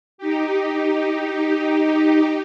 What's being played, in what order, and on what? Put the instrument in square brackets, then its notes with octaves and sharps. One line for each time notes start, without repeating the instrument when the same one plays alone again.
[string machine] D#4 G4